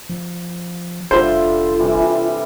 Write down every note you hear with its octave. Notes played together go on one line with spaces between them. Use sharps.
F3
F1 D3 G3 F4 C5 E5
C3 E3 G3